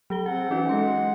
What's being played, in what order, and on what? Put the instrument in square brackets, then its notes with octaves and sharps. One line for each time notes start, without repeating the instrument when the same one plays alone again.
[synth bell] F#3 A4 G7
[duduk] C4 [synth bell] G#4 [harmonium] F#5
[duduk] E3 [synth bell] C#4 D#4 F#4
[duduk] G#3 [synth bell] A4 C6